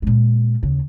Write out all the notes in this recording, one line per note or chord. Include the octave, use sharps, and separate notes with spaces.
A#2 G#3
D#2 C#3